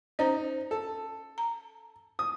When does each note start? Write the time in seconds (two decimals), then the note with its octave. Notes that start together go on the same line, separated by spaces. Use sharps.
0.19 C#4 D#4 C5 A#5
0.71 A4
1.38 A#5
2.19 D#6